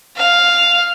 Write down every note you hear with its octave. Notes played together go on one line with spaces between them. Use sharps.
F5